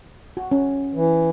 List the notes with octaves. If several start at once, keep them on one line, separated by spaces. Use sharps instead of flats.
F#4
C#4
E3